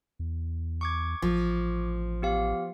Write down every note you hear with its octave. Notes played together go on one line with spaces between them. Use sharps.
E2
C#6 D6 G#6
A1 F3
B3 G4 F5